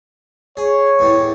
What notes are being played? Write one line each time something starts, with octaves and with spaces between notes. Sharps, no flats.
G#4 C#5
E2 A2 G3